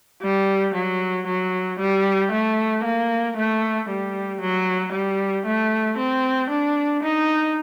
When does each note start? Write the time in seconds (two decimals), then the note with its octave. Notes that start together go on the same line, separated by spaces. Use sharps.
0.22 G3
0.75 F#3
1.27 F#3
1.79 G3
2.32 A3
2.84 A#3
3.37 A3
3.89 G3
4.41 F#3
4.93 G3
5.46 A3
5.98 C4
6.50 D4
7.03 D#4